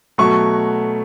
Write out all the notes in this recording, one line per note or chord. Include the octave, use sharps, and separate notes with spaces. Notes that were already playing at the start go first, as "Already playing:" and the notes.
B2 F#3 A3 C#6